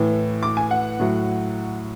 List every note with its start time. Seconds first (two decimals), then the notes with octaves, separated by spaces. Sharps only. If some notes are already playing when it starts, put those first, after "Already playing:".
Already playing: A2 E3
0.43 D6
0.57 G#5
0.71 F#5
1.00 A2 F#3